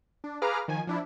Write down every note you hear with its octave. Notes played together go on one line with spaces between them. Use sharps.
D4
G#4 B4 F5 A#5 D6 F6
D#3 F3 G#5
F3 D4 E4